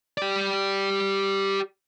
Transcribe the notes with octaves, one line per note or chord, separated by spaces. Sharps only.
G4 D5